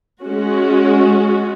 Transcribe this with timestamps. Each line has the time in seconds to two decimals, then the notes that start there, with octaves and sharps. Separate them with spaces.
0.22 G#3 C#4 F#4